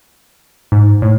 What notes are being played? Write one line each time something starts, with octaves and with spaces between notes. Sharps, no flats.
G#2
A2